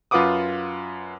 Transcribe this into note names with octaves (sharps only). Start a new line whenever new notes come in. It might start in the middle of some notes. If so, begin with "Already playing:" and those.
F#2 F4 B4 F#5 D6 D#6